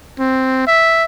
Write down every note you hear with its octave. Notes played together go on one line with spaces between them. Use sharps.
C4
E5